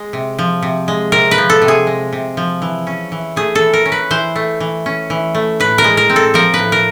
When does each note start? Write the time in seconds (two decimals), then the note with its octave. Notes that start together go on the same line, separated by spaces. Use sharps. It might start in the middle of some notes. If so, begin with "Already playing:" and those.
Already playing: G#3
0.13 C3
0.39 F3
0.62 C3
0.88 G#3
1.12 C3 A#4
1.31 B4
1.38 F3
1.50 A4
1.62 C3
1.68 G#4
1.87 G#3
2.13 C3
2.37 F3
2.62 E3
2.87 C#4
3.12 E3
3.36 A3 G#4
3.55 A4
3.60 E3
3.73 A#4
3.85 C#4
3.92 B4
4.11 E3 C5
4.36 A3
4.60 E3
4.86 C#4
5.10 E3
5.35 A3
5.60 A2 B4
5.78 A#4
5.84 G#3
5.97 A#4
6.10 C4
6.16 A4
6.34 F3 A#4
6.54 B4
6.59 A2
6.72 A#4